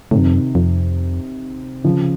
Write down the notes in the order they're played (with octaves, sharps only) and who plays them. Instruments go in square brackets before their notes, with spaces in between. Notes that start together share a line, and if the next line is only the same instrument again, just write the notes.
[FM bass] A2 [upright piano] C3 D#3
[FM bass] F#2
F2
F#2
F2
[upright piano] C#3 F3